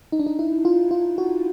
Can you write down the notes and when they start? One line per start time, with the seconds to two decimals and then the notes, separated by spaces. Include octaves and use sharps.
0.12 D#4
0.19 D4
0.26 D#4
0.39 E4
0.65 F4
0.91 F4
1.18 F#4